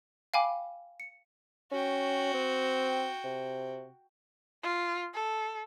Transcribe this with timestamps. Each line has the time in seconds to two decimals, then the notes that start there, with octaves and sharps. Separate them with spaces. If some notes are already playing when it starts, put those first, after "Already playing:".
0.34 F5 G5 G#5 B5 D6
1.00 C#7
1.72 C#4 F#4 G5
2.34 C4
3.24 C3
4.63 F4
5.14 A4